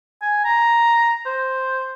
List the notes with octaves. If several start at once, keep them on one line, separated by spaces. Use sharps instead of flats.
G#5
A#5
C5